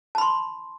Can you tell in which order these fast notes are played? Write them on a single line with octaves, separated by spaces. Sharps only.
A5 B5 C6